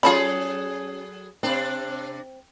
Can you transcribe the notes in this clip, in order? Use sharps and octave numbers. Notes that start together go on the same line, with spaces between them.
F#3 C#4 F4 G#4 A4 A5 B5
C3 C4 D4